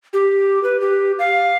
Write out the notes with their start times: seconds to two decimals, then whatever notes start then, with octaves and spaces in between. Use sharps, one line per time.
0.13 G4
0.63 B4
0.81 G4
1.19 F5